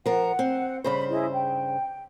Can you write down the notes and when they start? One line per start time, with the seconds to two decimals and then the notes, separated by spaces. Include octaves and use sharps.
0.06 F3 A#4 F#5
0.39 C4
0.84 G2 C#3 C5 B5
1.10 E4 G#4 D#5
1.33 G5